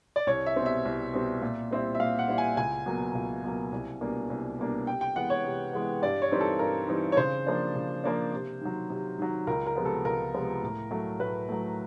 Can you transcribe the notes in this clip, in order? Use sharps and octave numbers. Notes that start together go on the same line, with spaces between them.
D5
C2 C#5
E5
B2 G3 C4
E5
C2
B2 G3 C4
A#2
G3 C4 E4
E5
A#2 F5
F#5
G3 C4 E4
G#5
C#2 G#5
B2 F#3 A#3
C#2
B2 F#3 A#3
C2
B2 G3 A#3 D4
C2
B2 G3 A#3 D4
C3 G5
G5
E3 G#3 B3 F#5
C#5
C3
E3 G#3 B3
G2 D5
C#5
E3 G3 C4 D#4
A4
G2 A#4
E3 G3 C4 D#4
C#5
C#3 C5
F3 A#3 D4
C#3
F3 A#3 D4
C3
D#3 F#3
C3
D#3 F#3
C#2 A#4
A#4
C3 F3 G#3 B3
A4
C#2 A#4
C3 F3 G#3 B3
A2
F#3 A3
A2 B4
F#3 A3